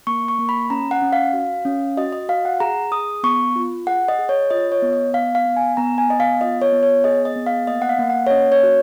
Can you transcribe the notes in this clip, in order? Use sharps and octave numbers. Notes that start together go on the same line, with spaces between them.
A#3 C#6
C#6
A#3
B5
C#4 A#5
F#5
C#4
F5
F#4
C#4
F#4 D#5
D#5
F#4 F5
F#5
G#4 A#5
G#4 D#6
B3 C#6
F4
G#4 F#5
D#5
G#4
C#5
F4 D#5
C#5
B3
D#5
B3 F5
F5
B3
G#5
B3 A#5
G#5
B3 D#5
F5
F4 D#5
C#5
B3
C#5
G#4 D#5
D#5
B3
F5
A#3 D#5
F#5
F5
A#3
F#5
C#5
C#4 D#5
C#5
F#4